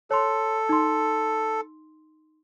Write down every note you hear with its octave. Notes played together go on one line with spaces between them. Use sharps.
A4 C#5 C6
D#4 C6